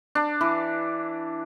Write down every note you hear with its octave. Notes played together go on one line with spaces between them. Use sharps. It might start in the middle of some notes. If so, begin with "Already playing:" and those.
D4
E3